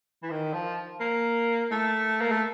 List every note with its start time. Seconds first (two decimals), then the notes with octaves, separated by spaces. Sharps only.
0.22 E3
0.30 D#3
0.54 F3
1.00 A#3
1.71 A3
2.21 A#3
2.31 A3